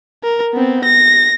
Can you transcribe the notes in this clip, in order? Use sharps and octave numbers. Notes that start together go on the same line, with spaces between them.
A#4
B3 C4
A#6